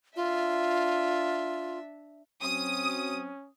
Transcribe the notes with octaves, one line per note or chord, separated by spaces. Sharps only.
D4 F4 E5
F#3 C4 C#4 D#6